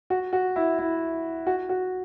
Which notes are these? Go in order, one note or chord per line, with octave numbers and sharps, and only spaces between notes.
F#4
F#4
E4
E4
F#4
F#4